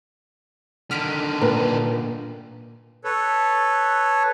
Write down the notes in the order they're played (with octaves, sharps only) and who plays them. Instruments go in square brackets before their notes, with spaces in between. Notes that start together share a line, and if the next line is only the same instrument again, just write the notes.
[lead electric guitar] D3 D#3 [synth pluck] F6 B6 D7
[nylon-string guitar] A#2 [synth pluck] A#4 B4
[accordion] A4 B4 C#5